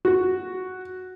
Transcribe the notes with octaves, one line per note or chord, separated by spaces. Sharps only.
F#4